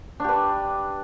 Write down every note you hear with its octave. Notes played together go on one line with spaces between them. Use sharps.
D4 G4 B4